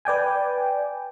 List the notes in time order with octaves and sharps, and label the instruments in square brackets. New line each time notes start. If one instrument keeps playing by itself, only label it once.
[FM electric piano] B4 D5 G5 G#5